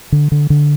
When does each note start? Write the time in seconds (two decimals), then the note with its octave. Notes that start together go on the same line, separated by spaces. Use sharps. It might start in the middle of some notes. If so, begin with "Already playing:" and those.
0.12 D3
0.32 D3
0.50 D3